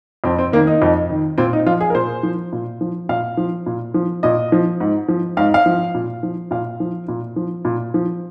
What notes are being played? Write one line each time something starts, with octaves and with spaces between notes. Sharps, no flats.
F2 C4
C4
D#3 A#3
D#4
F2
D#3
A#2 C4
D#4
F3 F4
G#4
A#4
A#2 C5
F3
A#2
F3
A#2 F5
F3
A#2
F3
A#2 D#5
F3
G#2
F3
G#2 F5
F5
F3
A#2
F3
A#2 F5
F3
A#2
F3
A#2
F3